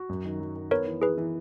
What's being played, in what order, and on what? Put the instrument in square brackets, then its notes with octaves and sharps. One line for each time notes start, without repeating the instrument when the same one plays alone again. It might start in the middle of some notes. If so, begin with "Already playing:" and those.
Already playing: [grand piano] F#4
F#2
D#3
F#3
D#3
[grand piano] B3 [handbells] A#4 C#5
[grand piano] E3
[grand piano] E3 [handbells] G#4 B4
[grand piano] E3